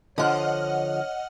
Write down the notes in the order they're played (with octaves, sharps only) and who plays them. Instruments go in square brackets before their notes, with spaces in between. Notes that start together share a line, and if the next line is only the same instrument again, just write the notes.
[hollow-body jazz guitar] D3 F3 [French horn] C#5 [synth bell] D#5 F#5 F6